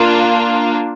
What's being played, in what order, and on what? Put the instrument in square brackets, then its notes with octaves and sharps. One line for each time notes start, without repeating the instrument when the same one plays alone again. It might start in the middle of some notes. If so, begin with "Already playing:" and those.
Already playing: [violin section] A#3 D4 F4